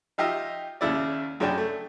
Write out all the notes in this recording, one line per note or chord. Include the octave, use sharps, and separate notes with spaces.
D#4 F4 G4 D#5 E5
D#2 C#3 E4 D5
F#2 C#3 C#4 D4 G5
A3